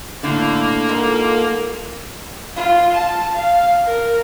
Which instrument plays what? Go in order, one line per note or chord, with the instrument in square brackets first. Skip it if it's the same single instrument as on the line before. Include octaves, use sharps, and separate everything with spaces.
[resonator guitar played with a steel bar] A2 D3 [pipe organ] A#3
[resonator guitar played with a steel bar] G#2 [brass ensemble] F4 A4 A#4
[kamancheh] F4
A5
F5
A#4